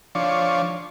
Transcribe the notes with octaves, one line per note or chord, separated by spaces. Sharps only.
F3 D4 C#5